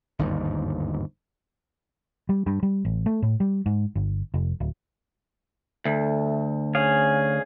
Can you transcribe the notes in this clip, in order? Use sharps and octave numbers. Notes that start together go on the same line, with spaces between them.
G1 D#2 G#2
G3
G2
G3
A1
A3
A2
G3
G#2
G1
F1
D1
D2 A3
C#4 G#4 F5